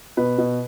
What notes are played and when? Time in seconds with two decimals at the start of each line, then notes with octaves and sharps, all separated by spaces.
0.17 B2 B4
0.38 B2